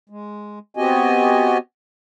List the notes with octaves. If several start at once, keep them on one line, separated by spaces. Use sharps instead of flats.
G#3
B3 C4 F#4 G4 D#5 G#5